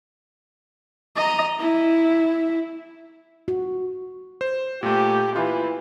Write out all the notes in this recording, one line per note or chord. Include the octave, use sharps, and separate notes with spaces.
D#5 A#5
E4
F#4
C5
A#2 A3 G4
E3 F4